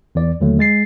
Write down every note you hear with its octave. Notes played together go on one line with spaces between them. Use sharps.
E2 E3 D5
D#2 D3 F#3 A3
G#3 A6 C7